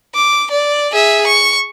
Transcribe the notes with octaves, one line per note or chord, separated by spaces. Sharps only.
D6
D5
G#4 E5
C#6